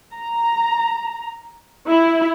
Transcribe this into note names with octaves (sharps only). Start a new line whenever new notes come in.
A#5
E4